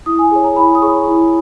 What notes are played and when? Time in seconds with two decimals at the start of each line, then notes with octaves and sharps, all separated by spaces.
0.06 E4 D#6
0.19 G#5
0.31 G#4 C#5
0.44 A#5
0.56 E4 B5
0.75 D#6
0.82 G#4 C#5 C#6
1.08 E4